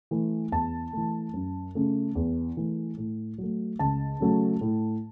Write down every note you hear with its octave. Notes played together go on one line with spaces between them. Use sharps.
E3 A3
E2 A5
E3 A3
F#2
C#3 A3
E2
E3 A3
A2
F#3 A3
C#2 A5
C#3 F#3 A3
A2